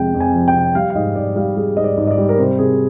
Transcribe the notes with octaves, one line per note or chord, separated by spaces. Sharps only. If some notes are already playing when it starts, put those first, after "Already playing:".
Already playing: F2 C3 F3 G#3 G5
F2
G#5
F3
G5
C3
G3 F5
F5
G#2 D#5
G#2 D5
G3 F5
G3 G#4
G#2 D#5
D5
G#2
D#5
D5
G3
A#4
C3 C5
C3 G#4